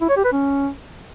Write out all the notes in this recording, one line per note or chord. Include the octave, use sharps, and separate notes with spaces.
E4
C#5
G4
B4
C#4